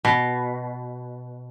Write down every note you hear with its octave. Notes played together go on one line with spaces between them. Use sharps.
B2